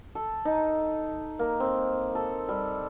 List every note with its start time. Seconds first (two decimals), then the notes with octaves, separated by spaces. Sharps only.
0.15 A4
0.45 D#4
1.39 A#3
1.60 C4
2.15 A4
2.49 G3